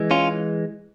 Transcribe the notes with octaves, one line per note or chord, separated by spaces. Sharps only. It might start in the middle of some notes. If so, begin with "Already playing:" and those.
Already playing: E3 G#3
C#4 F4